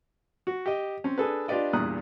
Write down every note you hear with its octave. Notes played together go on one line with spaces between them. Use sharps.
F#4
G4 D#5
C4 C#4
D4 G#4 A4 B4
D4 F4 G4 B4 D5 D#5
E2 G2 A#2 A#5 D#6 F#6